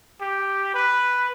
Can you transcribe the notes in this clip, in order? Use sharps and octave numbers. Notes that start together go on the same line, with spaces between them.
G4
B4